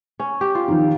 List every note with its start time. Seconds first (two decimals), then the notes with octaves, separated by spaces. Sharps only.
0.20 C#4
0.41 G4
0.55 F4
0.68 D#3 F3